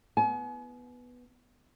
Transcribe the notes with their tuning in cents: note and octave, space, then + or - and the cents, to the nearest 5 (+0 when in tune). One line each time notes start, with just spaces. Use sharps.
B3 +0 G#5 +40